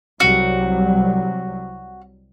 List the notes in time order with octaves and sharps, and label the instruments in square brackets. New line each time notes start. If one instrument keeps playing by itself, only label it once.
[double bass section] C2 F#3 G3 [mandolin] F#4